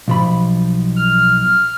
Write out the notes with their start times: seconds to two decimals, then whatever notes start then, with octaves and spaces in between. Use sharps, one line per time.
0.08 B1 F3 B5
0.96 F6